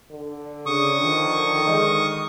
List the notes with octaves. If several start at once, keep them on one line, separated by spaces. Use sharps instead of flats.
D3
C#3 D4 C#6 D#6
D#3 F3
D#3 G#3